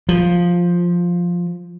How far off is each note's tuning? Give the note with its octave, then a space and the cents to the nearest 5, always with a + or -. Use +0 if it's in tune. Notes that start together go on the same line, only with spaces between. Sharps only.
F3 +5